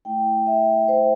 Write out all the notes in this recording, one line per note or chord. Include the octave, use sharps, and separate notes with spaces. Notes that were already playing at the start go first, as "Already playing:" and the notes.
A3 E4 G5
E5
C5